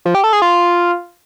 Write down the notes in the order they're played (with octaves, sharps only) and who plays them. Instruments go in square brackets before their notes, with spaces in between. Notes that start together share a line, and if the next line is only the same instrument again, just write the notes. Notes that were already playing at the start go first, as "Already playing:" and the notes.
[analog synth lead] F3
G4
A4
G#4
F4